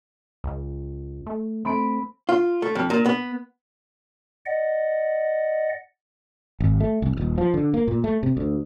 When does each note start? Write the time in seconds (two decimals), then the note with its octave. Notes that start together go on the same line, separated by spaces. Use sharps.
0.44 C#2
1.26 A3
1.65 A3 C4 B5 D7
2.29 F4
2.62 A3
2.75 F2
2.90 A#2
3.06 B3
4.46 D5 D#5 F#5
6.60 G#1
6.80 A3
7.02 C2
7.17 D#1
7.38 F3
7.54 D3
7.74 A#3
7.88 A#2
8.04 A3
8.23 C3
8.37 D2